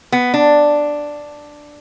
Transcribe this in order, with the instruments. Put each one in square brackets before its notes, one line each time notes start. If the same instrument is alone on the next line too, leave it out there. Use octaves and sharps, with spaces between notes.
[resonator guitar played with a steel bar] B3
D4